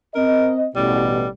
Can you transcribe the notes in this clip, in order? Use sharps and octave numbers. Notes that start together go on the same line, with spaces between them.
C4 A#4 D#5
A1 B2 G3